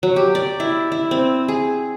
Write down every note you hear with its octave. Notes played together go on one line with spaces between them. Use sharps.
F#3
G4
D5
E4
E4
C4
G#4